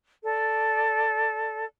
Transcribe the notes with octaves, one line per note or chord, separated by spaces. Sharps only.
A4 D5